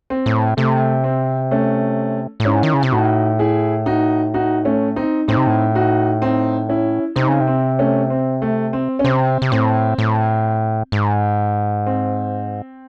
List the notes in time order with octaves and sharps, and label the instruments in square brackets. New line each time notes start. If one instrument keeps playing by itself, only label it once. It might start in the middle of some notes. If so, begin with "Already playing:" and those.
[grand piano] C4
[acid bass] A2
[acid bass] C3 [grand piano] A3
[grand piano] C4
A3 C#4
[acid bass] A2
[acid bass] G#2 [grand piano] C#4 E4
[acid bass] D#3
C#3
C3
[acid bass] A2 [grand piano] D#4 F#4
[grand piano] E4 G#4
D#4 F#4
D#4 F#4
A3 C#4
C4 D#4
[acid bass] A2 [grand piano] C4 D#4
[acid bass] C3
A2
[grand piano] D#4 F#4
C4 D#4
C#4 E4
[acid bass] C3 [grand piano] C4 D#4
[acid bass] C#3
C3
[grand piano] C4
A3 C#4
C4
A3
C4
C#4
[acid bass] C3 [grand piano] C4
[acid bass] C3
[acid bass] A2 [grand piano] C4
[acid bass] A2
G#2
[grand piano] C4